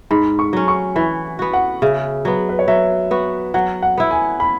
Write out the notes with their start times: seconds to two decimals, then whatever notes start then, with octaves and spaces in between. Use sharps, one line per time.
0.11 G#2 B5
0.39 C#6
0.53 F#3 C#4
0.68 C#6
0.96 E3 B5
1.39 B3 F#4
1.53 F#5
1.82 C#3 E5
2.25 F#3 B3
2.49 B4
2.59 C#5
2.68 F#3 E5
3.11 B3 F#4
3.54 F#3 F#5
3.83 F#5
3.98 B3 E4
4.11 G#5
4.40 B5